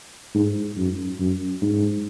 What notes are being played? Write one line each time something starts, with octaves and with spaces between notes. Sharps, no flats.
G#2
F#2
F#2
G#2